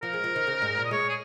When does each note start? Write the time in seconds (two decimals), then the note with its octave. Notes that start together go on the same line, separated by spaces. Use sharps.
0.02 F3 A#4
0.13 G#3
0.24 F3
0.36 D#3
0.47 C#3
0.62 G#2
0.77 A#2
0.85 D#5
0.91 G#3 C#5
1.09 G#4